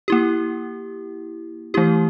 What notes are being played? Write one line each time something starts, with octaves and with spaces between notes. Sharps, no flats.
A#3 E4 G4
E3 A3 E4 G4